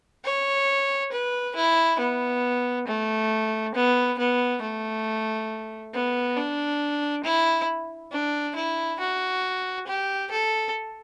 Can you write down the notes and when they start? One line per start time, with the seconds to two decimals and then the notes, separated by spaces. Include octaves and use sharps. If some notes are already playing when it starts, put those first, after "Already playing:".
0.25 C#5
1.12 B4
1.56 E4
2.00 B3
2.88 A3
3.75 B3
4.19 B3
4.62 A3
5.94 B3
6.37 D4
7.24 E4
8.12 D4
8.56 E4
9.00 F#4
9.87 G4
10.31 A4